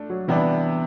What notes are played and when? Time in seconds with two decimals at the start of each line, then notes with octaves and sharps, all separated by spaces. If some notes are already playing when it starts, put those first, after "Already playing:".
Already playing: A3 D4
0.10 F#3
0.28 C3 E3 G3 B3 D4